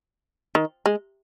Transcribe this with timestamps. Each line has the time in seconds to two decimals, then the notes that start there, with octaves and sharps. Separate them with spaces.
0.55 D#3
0.86 G#3